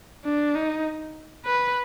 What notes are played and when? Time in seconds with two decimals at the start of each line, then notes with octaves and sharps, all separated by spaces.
0.25 D4
0.55 D#4
1.45 B4